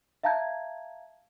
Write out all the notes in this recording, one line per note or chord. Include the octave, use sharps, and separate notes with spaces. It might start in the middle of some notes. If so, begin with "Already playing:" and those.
E5 F5 A5 A#5 G6 G#6